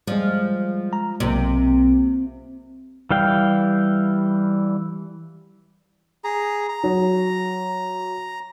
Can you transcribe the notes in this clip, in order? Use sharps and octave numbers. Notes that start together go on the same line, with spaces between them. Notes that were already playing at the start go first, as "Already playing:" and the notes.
F3 G3 G#3
A#5
B1 C3 A#3
E3 G3 F5 G5
G#4 A#5
A#5
F#3